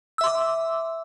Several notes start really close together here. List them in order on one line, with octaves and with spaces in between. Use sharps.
E6 E5 C6 D6